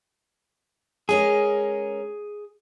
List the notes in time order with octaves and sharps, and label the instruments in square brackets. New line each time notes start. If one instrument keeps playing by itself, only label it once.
[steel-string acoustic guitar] G#3 C#4 A#4 [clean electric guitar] G#4